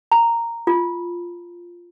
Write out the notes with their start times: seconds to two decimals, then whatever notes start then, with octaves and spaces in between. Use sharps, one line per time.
0.12 A#5
0.67 F4